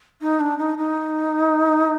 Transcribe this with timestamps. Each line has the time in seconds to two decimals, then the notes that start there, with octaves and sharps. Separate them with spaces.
0.21 D#4
0.40 D4
0.58 D#4
0.77 D#4